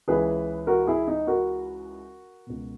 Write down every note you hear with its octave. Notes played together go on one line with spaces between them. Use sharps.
C#2 C#3 E3 G#4 B4
F#4 A#4
E4 G#4
D#4
F#4 A#4
C#2 B2